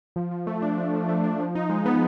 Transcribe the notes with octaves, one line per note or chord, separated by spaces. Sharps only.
F3
F3
A3
D4
F3
F3
A3
D4
F3
D#4
G#3
B3